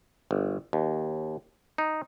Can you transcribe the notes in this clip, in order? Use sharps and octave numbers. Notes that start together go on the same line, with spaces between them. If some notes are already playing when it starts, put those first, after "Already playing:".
G1
D#2
D#4